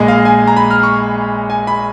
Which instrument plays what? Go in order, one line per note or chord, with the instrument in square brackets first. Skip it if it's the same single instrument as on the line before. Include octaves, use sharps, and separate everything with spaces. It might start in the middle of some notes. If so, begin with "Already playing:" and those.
Already playing: [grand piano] A#1 A#2 G#3 D#5
F5
G#5
A#5
B5
F6
C#6
G#5
B5